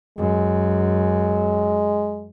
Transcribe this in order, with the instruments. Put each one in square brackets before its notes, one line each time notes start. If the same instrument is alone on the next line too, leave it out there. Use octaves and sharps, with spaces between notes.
[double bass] F#2 [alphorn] G#3